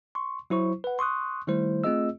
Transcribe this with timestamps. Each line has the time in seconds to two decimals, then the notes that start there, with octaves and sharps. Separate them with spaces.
0.15 C6 C#6
0.50 F#3 E4 C5 C#6
0.84 B4 F#5
0.99 C6 C#6 D#6 F#6
1.47 D#3 G3 A3 E4 C5
1.84 A3 C4 F4 G#4 D#5 E6